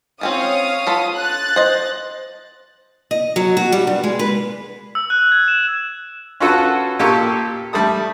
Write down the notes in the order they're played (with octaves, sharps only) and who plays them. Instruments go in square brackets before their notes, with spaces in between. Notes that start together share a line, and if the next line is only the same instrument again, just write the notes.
[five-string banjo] C4 C#4 F4 [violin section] C#5 F5 D#6
[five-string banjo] F4 A4 B5
[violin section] F#6 A6
[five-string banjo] C5 D#5
[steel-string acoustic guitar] D#5
F#3
F#4
G3
G2
G#3
B4
[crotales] E6
F#6
G#6
E7
[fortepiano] C#4 F4 F#4 A4 B4 F#5
A#2 A#3 G4 A4 C#6
G3 A3 A5 D#6